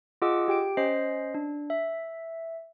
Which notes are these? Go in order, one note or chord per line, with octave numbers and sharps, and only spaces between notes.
F4 G#4 D#5 F#5 D6 E6
G4 G5 D7
C#4 C5 D#5 C7
D4
E5